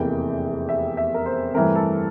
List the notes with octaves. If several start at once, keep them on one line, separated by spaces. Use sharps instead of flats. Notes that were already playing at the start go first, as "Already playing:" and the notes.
Already playing: F1 E2 C3 E3 A#3 G5
E5
E5
A#4
C5
G2 E3 A3 C4 A#4
A4